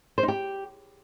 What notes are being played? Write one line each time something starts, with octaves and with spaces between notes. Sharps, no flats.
C5
D#4
G4